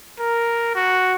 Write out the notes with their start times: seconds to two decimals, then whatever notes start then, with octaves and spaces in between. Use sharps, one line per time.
0.20 A#4
0.75 F#4